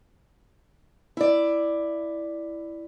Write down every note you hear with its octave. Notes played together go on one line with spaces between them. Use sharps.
E4 D5